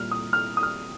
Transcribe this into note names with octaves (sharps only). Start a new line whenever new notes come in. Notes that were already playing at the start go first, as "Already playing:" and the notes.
Already playing: A#2 G3 F6
D#6
F6
D#6
F6